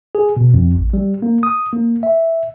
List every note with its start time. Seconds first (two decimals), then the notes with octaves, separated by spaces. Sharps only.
0.15 G#4
0.37 B2
0.54 F2
0.77 A1
0.93 G3
1.22 A#3
1.43 D#6
1.73 A#3
2.03 E5